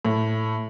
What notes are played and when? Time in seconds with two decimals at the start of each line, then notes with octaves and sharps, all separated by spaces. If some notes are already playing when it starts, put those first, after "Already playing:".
0.05 A2